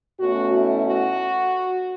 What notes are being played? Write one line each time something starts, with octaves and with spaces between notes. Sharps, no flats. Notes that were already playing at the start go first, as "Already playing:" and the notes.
B2 A3 C#4 F#4
E4
F#4